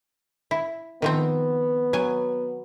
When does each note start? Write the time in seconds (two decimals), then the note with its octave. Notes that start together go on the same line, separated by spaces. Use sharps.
0.51 E4
1.02 D#3 F3 B3 C4
1.93 F#3 G#5